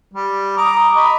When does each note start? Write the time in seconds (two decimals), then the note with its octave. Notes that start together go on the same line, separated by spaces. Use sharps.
0.14 G3
0.57 A#5 D6 D#6
0.96 D#5 B5 C#6